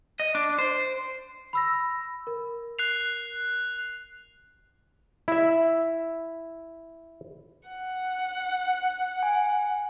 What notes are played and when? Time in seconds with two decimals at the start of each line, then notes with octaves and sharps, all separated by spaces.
0.20 D#5
0.35 D4
0.59 C5
1.53 B5 E6 A#6
2.27 A#4
2.79 F#6 C7 F7
5.28 E4 E5
7.69 F#5
9.23 G#5